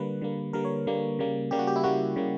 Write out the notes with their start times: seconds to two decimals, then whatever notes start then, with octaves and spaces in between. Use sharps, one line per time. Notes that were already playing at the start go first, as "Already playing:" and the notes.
Already playing: D3 G3 A#3 B4
0.21 D3 G3 A#3
0.53 D3 G3 A#3 A#4
0.65 C#5
0.87 D3 G3 A#3
1.19 C#3 G3 A#3
1.51 C#3 G3 A#3 G4
1.59 F#4
1.67 G4
1.76 E4
1.83 C#3 G3 A#3 F#4
2.16 C#3 G3 A#3